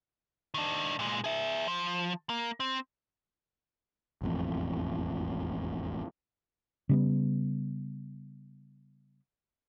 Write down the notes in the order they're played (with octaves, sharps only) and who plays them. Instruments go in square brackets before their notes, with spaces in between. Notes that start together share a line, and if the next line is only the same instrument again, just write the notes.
[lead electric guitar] D#3 D4
A#2 G#3
G#4 E5
F3
A#3
C4
[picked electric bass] E1 A1 F2
[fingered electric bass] C#3 G3 B3